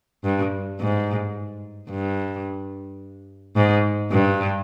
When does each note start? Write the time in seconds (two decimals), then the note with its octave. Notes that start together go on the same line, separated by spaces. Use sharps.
0.25 G2
0.81 G#2
1.91 G2
3.56 G#2
4.12 G2